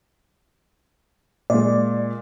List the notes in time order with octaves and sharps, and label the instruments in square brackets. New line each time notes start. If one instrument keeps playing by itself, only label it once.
[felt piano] A#2 G#3 [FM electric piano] D5